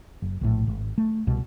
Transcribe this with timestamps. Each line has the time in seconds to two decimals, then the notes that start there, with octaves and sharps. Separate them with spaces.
0.22 F#1
0.41 A#1 A2
0.67 G#1
0.98 A3
1.27 C2 B2